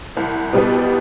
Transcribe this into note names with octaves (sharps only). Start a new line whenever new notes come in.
C2
B2 G3 B3